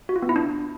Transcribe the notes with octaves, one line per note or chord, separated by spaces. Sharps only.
F#4
F4
B3
E4
D4